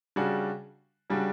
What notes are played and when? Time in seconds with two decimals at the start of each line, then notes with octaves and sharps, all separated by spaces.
0.16 C#3 G3 D4 F#4
1.10 C#3 G3 D4 F#4